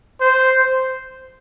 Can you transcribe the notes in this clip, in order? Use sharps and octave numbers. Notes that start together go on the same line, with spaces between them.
C5